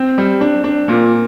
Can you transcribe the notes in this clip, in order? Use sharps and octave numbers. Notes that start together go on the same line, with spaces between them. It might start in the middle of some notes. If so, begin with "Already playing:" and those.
Already playing: C4
G3
D4
D4
A#2 A#3